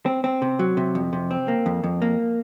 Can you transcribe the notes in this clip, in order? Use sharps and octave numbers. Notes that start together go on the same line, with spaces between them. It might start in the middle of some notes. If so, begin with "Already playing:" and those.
C4
C4
C3
F#3
C3
F2
C3
C4
A#3
F2
F2
A#3